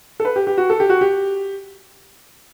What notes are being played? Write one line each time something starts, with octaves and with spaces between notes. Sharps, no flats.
A4
B4
G4
G4
F#4
A4
G4
F#4
G4